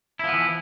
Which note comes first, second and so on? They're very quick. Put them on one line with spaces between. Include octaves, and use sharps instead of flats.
E4 F3 B3 E3